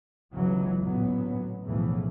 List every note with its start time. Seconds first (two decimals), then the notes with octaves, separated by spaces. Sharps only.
0.33 G1 C#2 C#3 E3 F#3
0.81 A1 D2 A#2 F#3 B3
1.64 B1 E2 A2 C#3 E3 F3